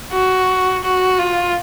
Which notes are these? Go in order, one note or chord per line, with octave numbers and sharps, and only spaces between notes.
F#4
F#4
F4